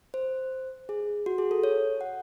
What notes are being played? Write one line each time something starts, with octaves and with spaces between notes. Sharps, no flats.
C5
G#4
F#4
G#4
A4
C#5
F#5